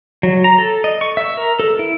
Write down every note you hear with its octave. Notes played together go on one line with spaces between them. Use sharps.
F#3
A#5
A4
D#5
C#6
E5
A#4
A4
E4